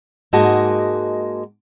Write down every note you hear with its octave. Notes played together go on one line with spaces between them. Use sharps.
G#2 G#3 A#3 F#4 D#5 A5